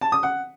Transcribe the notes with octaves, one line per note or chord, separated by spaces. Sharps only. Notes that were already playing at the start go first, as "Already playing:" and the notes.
A5
D#6
F#5